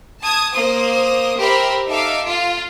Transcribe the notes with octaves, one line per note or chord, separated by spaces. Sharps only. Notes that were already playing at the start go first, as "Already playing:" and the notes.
A5 D#6 G#6
A#3 C5 D#6
G4 A#4 C5 E5 B5
D#4 A4 E5 F5 D6
F4 F5